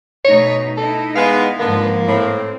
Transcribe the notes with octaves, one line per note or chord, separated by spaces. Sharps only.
B2 A3 D#4 C#5
D#4 E4 A4
G#3 B3 F5
G#2 D3 F3 A#3 B3
A2 C4